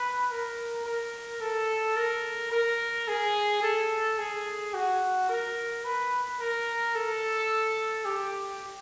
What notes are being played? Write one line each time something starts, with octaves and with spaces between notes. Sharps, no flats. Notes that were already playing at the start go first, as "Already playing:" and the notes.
Already playing: B4
A#4
A#4
A4
A#4
A#4
G#4
A4
G#4
F#4
A#4
B4
A#4
A4
G4